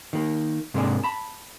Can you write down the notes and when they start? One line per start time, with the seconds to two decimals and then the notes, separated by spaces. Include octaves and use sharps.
0.13 D#3 A#3
0.74 G#2 C3 G#3 A#3 D4 G#4
1.04 A5 B5